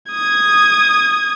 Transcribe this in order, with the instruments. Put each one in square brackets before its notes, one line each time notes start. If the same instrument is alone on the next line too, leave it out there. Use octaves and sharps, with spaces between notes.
[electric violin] D#6 G#6